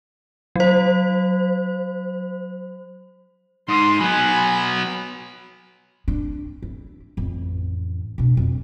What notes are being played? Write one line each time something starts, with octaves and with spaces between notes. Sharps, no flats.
F#3 C5
G#2 C6 D#6
F#3 B3 G#5 B5
C4 D4
E4
A1 F2
B2 D4
F2